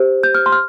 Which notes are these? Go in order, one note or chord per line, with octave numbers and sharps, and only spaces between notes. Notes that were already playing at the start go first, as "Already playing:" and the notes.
Already playing: G4 C5
G6
F6
C6
F6